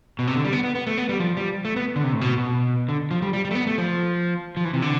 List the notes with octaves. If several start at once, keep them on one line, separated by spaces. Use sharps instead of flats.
B2
C3
D3
G3
B3
B3
B3
A3
B3
G3
F3
G3
A3
B3
D3
C3
A2
B2
B2
D3
F3
G3
G3
G3
A3
B3
A3
F3
F3
E3
C3
D3